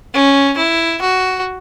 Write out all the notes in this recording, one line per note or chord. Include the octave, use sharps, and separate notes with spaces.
C#4
E4
F#4